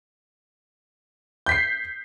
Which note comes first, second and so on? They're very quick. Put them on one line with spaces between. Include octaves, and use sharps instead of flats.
G6 B6 C7